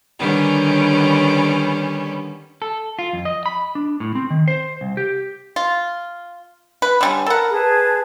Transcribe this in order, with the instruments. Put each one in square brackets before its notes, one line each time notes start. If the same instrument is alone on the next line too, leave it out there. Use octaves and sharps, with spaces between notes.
[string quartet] D3 D#3 G3 B3 C#4
[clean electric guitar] A4
F4
F2
D#5
B5
D4
A2
C4
D#3
C5
C2
G4
[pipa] F4
B4
D3 G3 C#4
[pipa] A4 F#5 [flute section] A#4 B5
[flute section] G#4 B4 A5